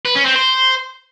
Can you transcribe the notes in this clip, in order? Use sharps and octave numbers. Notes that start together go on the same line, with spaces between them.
B4
C#4
C4
C5